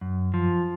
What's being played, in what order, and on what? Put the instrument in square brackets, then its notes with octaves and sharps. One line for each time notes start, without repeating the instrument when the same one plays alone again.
[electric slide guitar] F#2
F3